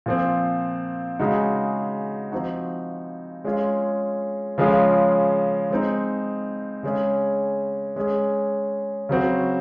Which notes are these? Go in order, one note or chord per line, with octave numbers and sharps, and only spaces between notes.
A#2 F3 C4
C#3 G#3 D#4 F#4
F3 C4 D#4 F#4
G#3 C#4 F4 G#4
C#3 F3 G#3 C#4 F4
G#3 C4 D#4
C#3 G#3 C#4 G#4
G#3 C#4 G#4
C#3 F#3 C4 F#4